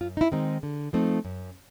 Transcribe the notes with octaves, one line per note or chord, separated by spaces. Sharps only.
F#2 F4
D#4
E4
D#3 G#3 C4 D#4
D3
F3 A3 C4 D#4
F#2